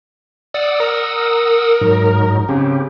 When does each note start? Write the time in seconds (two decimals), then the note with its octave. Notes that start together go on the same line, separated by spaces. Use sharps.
0.54 D5 F#5 D#6 E6
0.80 A#4
1.81 G#2 F#3 D#4
2.49 C#3 C4 G4